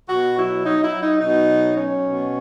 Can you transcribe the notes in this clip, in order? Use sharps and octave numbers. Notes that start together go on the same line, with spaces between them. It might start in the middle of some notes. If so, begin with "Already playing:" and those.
B2 F#4
F#3 E4
F#3 D#4
E4
F#3
D#4
B2 D#4
F#3
F#3 C#4
B2